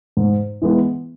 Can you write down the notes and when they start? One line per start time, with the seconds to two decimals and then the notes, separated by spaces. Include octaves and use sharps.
0.17 G#2
0.62 E3 G#3 B3